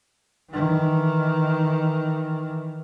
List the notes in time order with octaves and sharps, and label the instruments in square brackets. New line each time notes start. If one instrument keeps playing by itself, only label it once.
[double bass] D#3 E3